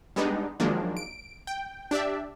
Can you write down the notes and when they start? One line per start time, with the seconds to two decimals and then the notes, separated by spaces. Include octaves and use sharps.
0.16 G3 G#3 B3 D4 D#4
0.60 D#3 F3 F#3 G#3 A#3 D4
0.97 D7
1.47 G5
1.91 D4 G4 D5 E5